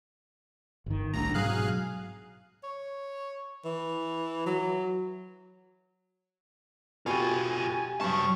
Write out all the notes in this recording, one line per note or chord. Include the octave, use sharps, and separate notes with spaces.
G1 D#3
C2 A2 D4 A#5
G#2 B2 F#3 G#4 F5 F#6
C#5
E3
F#3
B2 F4 G4 G5 G#5
G2 F#3 A5 C#6